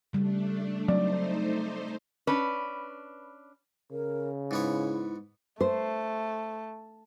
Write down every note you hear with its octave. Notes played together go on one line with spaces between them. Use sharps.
C#3 G3 A3 D4
F#3 A3 C4 D#4 C5 D5
C#4 D4 B4
C#3 A#4
G#2 B3 E4 C#5
A3 C5